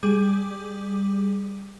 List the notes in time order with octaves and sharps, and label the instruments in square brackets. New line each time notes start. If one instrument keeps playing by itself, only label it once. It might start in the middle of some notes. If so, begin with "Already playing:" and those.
[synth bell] G3 G#4 D6